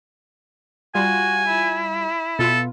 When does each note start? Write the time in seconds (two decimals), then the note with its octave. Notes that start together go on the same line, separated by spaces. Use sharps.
0.95 G3 F4 F#4 G#5
1.48 E4
2.39 B2 B3 F4 A4